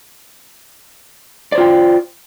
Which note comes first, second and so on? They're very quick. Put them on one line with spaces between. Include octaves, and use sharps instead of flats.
D5 C5 F4 G5